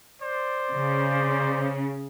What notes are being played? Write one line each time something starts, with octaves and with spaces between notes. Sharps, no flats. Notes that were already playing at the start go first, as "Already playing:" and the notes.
C5 D5
C#3